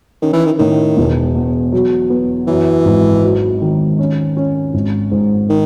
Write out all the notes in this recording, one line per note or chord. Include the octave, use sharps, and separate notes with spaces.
D#3 C#4
E3
D#3
A2 D#3
E1
E2
F#3
B3
F#2 E3
G#1
F#3
D#3
C#4
C#4
G#1
G#2
D#3